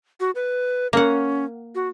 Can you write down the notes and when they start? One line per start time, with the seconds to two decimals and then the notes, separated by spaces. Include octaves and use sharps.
0.20 F#4
0.35 B4
0.93 A#3 C#4 F#5
1.75 F#4